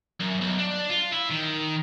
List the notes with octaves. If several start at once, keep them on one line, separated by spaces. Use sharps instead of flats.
F#2
B1
D4
F4
E4
D#3